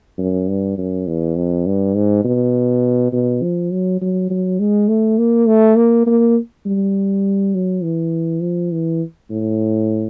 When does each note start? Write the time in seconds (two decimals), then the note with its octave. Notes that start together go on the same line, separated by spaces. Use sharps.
0.18 F#2
0.48 G2
0.78 F#2
1.07 E2
1.36 F2
1.66 G2
1.96 G#2
2.25 B2
3.13 B2
3.42 F3
3.72 F#3
4.02 F#3
4.30 F#3
4.60 G#3
4.89 A3
5.19 A#3
5.47 A3
5.77 A#3
6.07 A#3
6.66 G3
7.54 F#3
7.83 E3
8.42 F3
8.72 E3
9.31 A2